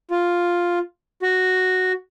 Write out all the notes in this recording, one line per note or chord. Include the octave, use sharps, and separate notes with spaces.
F4
F#4